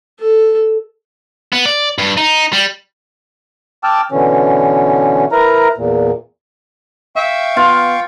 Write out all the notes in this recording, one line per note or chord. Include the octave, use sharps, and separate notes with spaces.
A4
B3
D5
G2
D#4
G3
G5 A5 D6 E6 F6
B2 D3 E3 C#4
E4 A#4 B4 A#5
E2 A#2
E5 F5 G5 C#6
B3 F4